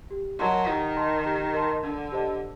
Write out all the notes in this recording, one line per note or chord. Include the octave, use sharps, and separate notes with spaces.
G4
F#3 A#4 D#5 A5 C6
D#3 G4
A#4 D#5 A5 C6
G4
A#4 D#5 A5 C6
D3 D4
G4 C5 D#5 A5